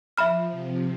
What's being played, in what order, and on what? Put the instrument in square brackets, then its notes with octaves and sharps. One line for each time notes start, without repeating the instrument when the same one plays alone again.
[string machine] F3 [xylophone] E5 B5 F6
[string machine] C3